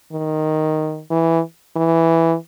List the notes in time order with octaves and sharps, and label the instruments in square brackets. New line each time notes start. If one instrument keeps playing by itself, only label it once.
[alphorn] D#3
E3
E3